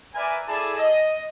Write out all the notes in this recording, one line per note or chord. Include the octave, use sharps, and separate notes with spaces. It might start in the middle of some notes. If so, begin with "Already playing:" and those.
A#4 B4 D5 E5 G#5
E4 G#4 A4 D5 A5
D#5